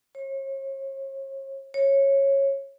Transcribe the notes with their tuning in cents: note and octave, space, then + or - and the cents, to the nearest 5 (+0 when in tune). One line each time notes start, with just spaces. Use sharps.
C#5 -40
C#5 -15